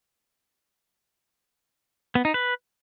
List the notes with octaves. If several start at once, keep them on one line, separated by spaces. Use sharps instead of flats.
B3
D#4
B4